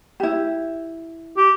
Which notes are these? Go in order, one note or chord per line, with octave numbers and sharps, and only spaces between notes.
E4 G4
G4